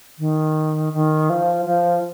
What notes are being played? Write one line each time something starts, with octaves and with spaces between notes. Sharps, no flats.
D#3
D#3
F3
F3